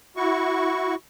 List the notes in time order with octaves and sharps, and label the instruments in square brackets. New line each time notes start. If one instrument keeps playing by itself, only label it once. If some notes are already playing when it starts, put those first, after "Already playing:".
[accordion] E4 F#4 C#6